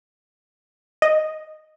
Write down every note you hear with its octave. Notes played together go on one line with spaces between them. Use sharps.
D#5